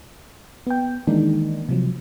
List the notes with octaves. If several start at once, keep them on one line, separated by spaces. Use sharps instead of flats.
B3 G5
D#3 E3 G#3 A#3 D4 D#4
C3 F3 F#3